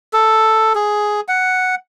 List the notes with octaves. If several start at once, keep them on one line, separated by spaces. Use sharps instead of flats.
A4
G#4
F#5